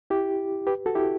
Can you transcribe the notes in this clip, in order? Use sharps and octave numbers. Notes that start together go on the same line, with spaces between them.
E4 G4
G4 B4
F#4 A4
E4 G4